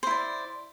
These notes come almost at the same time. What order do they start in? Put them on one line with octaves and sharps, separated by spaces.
C5 E4 D5